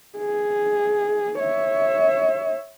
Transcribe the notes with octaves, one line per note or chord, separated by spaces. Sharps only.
G#4
C#5 E5